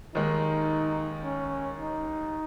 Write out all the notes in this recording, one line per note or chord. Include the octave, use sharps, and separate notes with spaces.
D#2 D#3 G#3 D#4
C#4
D#4